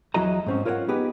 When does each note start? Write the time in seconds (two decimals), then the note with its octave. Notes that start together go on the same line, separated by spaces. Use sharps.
0.14 E2 F#3 E4 F#4 D#5 A#5
0.46 G#2 C4 C#4
0.65 F4 A#4 C#5 D#5 F#5
0.88 B3 D#4 G4 G#4 B4